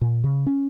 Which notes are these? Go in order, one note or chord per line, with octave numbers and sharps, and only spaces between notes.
A#2
C#3
C#4